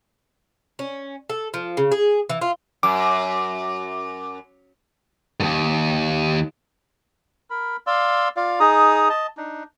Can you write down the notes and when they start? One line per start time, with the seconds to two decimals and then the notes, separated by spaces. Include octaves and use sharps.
0.79 C#4
1.29 A4
1.54 F3
1.77 C#3
1.92 G#4
2.30 E3
2.41 F4
2.83 F#2 D6
5.40 D#2 G#2
7.50 A#4 B5
7.87 D5 F5 C6 E6
8.37 F4 D5 F5
8.60 D#4 G#4 A#5 D#6
9.10 D#5 A5
9.37 D4 D#4